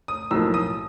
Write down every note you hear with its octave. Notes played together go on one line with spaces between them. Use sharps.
D#6
B1 A2 F3 A#3 E6
D#6